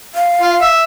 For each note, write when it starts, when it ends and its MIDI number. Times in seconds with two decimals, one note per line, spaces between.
0.15 0.69 77
0.41 0.55 65
0.61 0.81 76